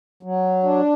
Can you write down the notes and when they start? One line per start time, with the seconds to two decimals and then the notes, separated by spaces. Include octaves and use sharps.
0.23 F#3
0.63 D4